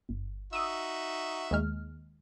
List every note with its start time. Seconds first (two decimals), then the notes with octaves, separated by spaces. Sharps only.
0.09 G1
0.53 D#4 F#4 E5 D#6 E6
1.51 D#2 G#3 F6